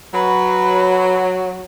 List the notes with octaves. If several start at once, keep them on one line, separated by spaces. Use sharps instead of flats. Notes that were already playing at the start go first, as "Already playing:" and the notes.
F#3 B4